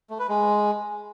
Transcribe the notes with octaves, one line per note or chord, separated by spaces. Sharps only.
A3
B4
G#3